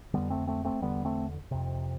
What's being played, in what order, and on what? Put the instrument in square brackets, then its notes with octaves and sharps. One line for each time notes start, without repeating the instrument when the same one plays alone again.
[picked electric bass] F2 D3 G3 B3
A3 C4
A3 C4
A3 C4
E2 D3 G3 B3
A3 C4
F2 C3